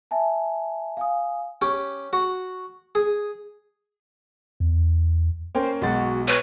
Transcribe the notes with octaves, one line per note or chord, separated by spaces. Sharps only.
E5 G#5 A5
F5 G#5 D#6
C#4 G4
F#4
G#4
E2
A#3 C#4 C5 G5
B1 G#3 F#4 A6
B4 C#5